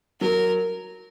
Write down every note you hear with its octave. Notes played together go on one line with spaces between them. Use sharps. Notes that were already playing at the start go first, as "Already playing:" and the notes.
F#3 A#4